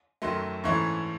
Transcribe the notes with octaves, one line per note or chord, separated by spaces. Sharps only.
F#2 D#3 F#3 A3 C6
G#2 E3 A3 C#4 C#6